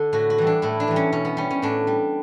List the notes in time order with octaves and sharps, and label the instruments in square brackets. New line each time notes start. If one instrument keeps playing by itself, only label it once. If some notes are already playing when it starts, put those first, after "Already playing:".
Already playing: [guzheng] D3 A4
A2 F#4
F#4
E3 G3
D4
A2 E4
D4
E3 G3
C#4
B2 C#4
B3
G3 C#4
C#4
A2 D4
G3